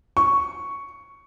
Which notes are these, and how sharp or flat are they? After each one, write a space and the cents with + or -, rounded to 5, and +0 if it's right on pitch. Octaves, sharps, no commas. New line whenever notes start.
C#6 +5